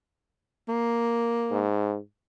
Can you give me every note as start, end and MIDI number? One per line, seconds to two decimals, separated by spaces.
0.69 1.67 58
1.51 1.97 44